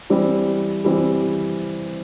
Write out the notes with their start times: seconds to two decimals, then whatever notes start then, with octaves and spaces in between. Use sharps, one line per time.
0.10 E3 G3 C4
0.85 E3 G3 C4